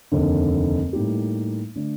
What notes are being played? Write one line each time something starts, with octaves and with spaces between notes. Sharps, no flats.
F1 D#2 D3
A2 G3 A#3 D#4 G4
D3 A3 D4